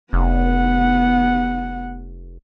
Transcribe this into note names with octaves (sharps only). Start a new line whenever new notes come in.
F1 B3 F#5